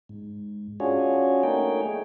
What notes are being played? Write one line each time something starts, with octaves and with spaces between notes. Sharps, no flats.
G#2
C#4 D4 F4 F#4 G#4 C#5
A3 A#3 D#4 G#4 C#5 G5